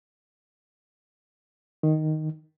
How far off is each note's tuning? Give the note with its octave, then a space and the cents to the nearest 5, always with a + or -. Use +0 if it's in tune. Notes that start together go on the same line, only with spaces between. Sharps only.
D#3 +0